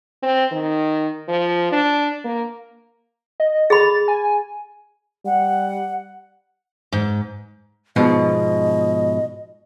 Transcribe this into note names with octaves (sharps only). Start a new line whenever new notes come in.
C4
D#3
F3
D4
A#3
D#5
G#4 B5 A6
G#5
G3 F#5
G#2
G#2 B2 F3 D#5